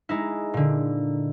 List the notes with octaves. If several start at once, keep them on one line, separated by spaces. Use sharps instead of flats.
G#3 D#4 E4
A#2 D3